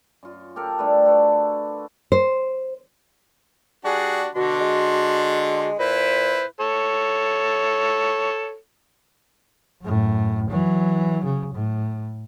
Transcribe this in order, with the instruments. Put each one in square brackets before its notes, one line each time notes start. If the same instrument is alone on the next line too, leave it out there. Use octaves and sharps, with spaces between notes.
[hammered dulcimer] F#2 F4
G4 A4 A#4 F5
D3 G3 A3 B4
F#4 A4 B4 D5
[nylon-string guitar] C5
[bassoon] G3 [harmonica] D4 F#4 [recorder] G#4
[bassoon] B2 [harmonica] D3 D4 C6 [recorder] F#4
[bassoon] G#3
[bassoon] A#2 [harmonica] E4 B4 [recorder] C5
[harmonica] A4 C#5
[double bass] F#2 A2
E3 F#3
C#3
A2